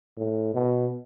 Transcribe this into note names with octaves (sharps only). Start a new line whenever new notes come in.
A2
B2